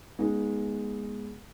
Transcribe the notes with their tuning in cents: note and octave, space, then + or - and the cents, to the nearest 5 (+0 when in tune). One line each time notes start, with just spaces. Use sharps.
G#3 +0 B3 -25 D#4 +0